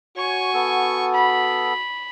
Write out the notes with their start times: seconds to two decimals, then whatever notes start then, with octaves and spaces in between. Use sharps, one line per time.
0.17 F#4 C#5 G#5 C#6
0.54 B3 A4
1.14 B5